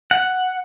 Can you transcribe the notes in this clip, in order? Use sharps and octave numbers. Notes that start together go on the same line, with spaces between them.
F#5